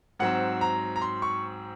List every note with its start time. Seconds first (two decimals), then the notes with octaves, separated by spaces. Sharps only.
0.19 G#2 F#3 C4 F#5
0.61 A#5
0.96 A#5
1.02 C6
1.22 C#6